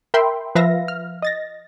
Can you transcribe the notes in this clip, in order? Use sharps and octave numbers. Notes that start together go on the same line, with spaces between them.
A#4 E5 G5 B5 C6
F3 B4 E5 F5 A#6
F6
D#5 A6 A#6